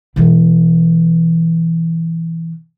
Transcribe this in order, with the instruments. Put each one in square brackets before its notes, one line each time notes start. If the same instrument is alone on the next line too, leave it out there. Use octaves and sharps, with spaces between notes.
[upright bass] B2 E3